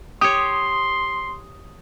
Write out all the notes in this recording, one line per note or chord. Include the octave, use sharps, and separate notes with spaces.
G4 C#5 C6 D#6